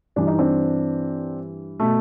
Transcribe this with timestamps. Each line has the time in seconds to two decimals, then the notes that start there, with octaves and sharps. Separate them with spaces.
0.16 G2 E3 D4
0.27 D#4
0.39 C4 D4
1.80 B2 A3